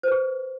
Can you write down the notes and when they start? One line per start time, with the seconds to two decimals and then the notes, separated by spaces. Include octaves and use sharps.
0.03 C5
0.07 B4
0.12 G#4